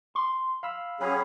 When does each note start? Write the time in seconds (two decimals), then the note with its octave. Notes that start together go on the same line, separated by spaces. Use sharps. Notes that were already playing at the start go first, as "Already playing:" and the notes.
0.15 C6
0.63 F5 B5 E6
1.00 F#3 C#4 G4 G#4 B4 C#5